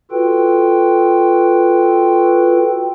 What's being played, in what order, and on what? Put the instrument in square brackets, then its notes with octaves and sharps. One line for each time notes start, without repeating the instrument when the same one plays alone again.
[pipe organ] F4 F#4 A4 B4 G5